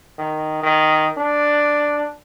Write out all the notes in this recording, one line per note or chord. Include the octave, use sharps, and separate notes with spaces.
D#3
D#3
D4